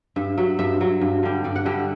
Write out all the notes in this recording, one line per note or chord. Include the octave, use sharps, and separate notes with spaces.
G2 E5
F#3 E5
G2 E5
F#3
G2
D3 G3
G2 D5
F#5
D3 G3 E5